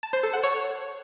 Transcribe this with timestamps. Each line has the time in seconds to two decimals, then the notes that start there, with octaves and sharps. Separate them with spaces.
0.03 A5
0.13 C5
0.23 A4
0.33 F#5
0.43 C#5